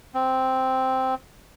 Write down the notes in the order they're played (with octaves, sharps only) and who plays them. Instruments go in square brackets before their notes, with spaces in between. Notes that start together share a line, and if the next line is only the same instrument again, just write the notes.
[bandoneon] C4